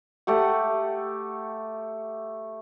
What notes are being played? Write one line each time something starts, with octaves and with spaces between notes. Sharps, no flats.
A3 G4 F#5